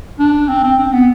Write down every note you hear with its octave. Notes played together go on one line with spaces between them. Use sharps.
D4
C4
C4
C4
B3